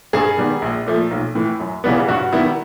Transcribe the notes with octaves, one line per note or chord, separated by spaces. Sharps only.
G2 G#4
D#3 G3 B3
A#1
A#2 F3 A3
B1
A2 E3
F#2
C#3 E3 G3 B3
G2 F#4
D#3 G3 B3 E4